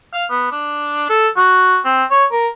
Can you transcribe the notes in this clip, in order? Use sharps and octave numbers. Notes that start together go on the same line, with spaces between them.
F5
B3
D4
A4
F#4
C4
C#5
A#4